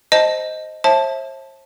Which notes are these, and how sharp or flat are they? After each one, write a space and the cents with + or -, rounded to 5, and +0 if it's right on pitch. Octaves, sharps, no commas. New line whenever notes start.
C5 +0 D#5 +0 A5 +0
C5 +45 E5 +0 A5 +0